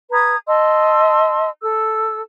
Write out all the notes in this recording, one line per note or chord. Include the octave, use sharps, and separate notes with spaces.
B4 A#5 D#6 G#6
D#5 A5 C6 E6
A4 E6